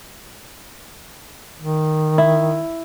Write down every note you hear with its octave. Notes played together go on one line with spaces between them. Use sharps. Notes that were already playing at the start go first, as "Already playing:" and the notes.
D#3
E4